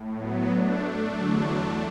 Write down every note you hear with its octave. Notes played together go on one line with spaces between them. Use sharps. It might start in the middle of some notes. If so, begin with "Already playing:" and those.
Already playing: A2
F#3 B3
A3 D4
E2 D3 F#3